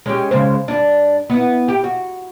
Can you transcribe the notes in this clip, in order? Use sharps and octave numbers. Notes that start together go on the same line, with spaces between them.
G#3 C#4 G4
C#3 G#3 C5
G2 D4
B3 E4
G4
F#4